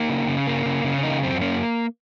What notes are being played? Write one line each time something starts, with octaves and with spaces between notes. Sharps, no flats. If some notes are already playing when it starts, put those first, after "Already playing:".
Already playing: A#3 D#4
C#3
C#3
A#3
C#3
C#3
C#4
A#3 D#4
F#2 C4
A#3 C#4